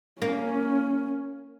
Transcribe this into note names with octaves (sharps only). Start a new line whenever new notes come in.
A#3 C#4